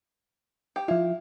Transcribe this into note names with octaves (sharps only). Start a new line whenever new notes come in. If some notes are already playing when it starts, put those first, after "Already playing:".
G4
F3 E4 F4